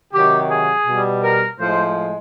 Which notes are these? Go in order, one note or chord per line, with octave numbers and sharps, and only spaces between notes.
C3 D#3 F#3 G4
G#4
B2
G3
A#4
A2 F3 G#3 C5